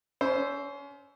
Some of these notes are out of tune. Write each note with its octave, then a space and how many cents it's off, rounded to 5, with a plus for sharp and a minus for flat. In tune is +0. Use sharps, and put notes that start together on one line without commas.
C#4 +30 C5 +0 E6 +0